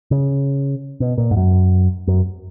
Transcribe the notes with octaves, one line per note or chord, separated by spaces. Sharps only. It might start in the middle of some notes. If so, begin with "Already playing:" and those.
C#3
B2
A#2
G#2
F#2
F#2